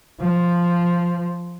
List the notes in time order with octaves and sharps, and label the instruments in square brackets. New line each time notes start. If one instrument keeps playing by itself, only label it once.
[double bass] F3